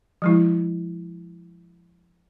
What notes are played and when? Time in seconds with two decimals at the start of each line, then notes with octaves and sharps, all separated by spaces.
0.22 F3 G#3 E4